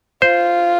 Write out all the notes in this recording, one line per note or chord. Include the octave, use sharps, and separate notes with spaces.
F4 C5